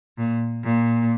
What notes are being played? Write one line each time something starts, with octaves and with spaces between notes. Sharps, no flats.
A#2
A#2